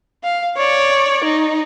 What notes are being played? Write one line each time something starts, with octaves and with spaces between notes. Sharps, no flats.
F5
C#5 D5
D#4